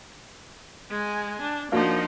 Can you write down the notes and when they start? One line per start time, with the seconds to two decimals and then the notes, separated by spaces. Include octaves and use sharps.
0.91 G#3 G#5
1.42 D4
1.72 F3 A#3 D4 D#4 F#4